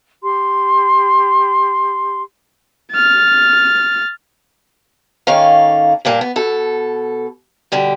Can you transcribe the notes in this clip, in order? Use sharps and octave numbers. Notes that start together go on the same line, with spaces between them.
G4 C6
F6 A6
D#3 A#3 C#4 A4 F5
G2 A#2 A#3 D4
B3
B2 A4
B2 D3 G3